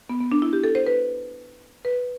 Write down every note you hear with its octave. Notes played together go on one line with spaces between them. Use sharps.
B3
B3
D4
E4
G4
A4
C5
B4
B4